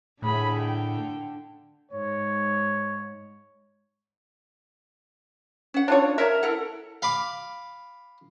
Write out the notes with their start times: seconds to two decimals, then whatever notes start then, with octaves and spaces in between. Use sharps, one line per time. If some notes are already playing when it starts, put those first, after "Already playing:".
0.22 A2 D3 G#4 B5
0.59 G5
1.91 G#2 C#5
5.74 C#4 F#5
5.88 D4 F4 C#5
6.18 A#4 C#5 E5
6.43 E4 A4 F#5
7.02 F5 B5 D6